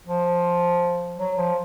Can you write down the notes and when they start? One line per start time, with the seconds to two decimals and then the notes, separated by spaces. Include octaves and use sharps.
0.07 F3
1.18 F#3
1.37 F3